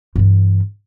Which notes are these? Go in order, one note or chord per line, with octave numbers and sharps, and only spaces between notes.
G2 E3